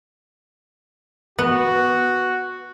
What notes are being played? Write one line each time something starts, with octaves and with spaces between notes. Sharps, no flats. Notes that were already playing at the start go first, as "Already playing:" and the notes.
B3 F#4